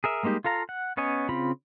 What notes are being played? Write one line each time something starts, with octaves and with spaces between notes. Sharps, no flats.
G#4 A#4 E5
G3 G#3 A#3 D#4 G4
F4 A4 F5 A#5
F#5
B3 C#4 C#5 D#5 G#5
C#3 C4 F4 B5